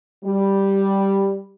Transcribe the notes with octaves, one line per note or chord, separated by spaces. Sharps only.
G3